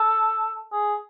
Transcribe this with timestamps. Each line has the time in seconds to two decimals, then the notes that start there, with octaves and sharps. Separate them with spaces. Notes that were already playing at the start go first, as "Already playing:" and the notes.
Already playing: A4
0.72 G#4